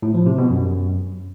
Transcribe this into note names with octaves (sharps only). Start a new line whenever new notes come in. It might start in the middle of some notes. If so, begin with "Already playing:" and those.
A2
F3
C3
B2
F#2